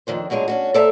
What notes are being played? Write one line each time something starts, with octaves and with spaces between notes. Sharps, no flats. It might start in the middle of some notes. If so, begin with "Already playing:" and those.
F2 D#3 D4 C5
B2 F#3 G#3 D4 F4
C#4 D4 F#4
A4 C5 D5 E5 A5 A#5